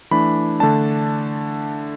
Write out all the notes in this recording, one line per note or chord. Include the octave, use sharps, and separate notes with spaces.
E3 A3 D4 B5
D3 A3 D4 A5